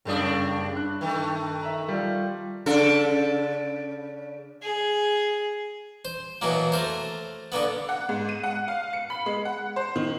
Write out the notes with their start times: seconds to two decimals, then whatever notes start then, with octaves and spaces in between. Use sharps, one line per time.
0.05 F#1 A2 C#3 G3 D4 D#6
0.76 G2 F#6
1.01 D#3 A3
1.61 E5 A#5
1.88 G3 F4
2.66 C#3 D4 A4
4.63 G#4
6.05 C5
6.42 B2 E3 F#3 A#3
6.72 A3 A#4 C5
7.52 D3 A#3 B3
7.89 F#5
8.09 G#2
8.29 D#7
8.43 F#5
8.68 F5
8.93 C#7
9.10 B5
9.26 G#3
9.45 F#5
9.76 C5
9.96 D#3